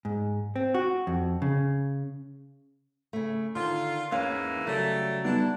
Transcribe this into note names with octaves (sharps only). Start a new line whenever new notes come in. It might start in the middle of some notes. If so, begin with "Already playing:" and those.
G#2
C4
F#4
F2
C#3
C#3 A3
D3 D#3 F4
E2 G#2 E3 A#3 C#4 F5
C#3 F#3 G3 A3
E3 G3 B3 D4 D#4